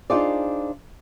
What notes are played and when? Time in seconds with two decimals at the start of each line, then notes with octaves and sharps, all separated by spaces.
0.10 D4 D#4 F4 G#4 C5 D5